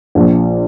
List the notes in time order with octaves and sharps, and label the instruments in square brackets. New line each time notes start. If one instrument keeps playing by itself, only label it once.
[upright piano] A#1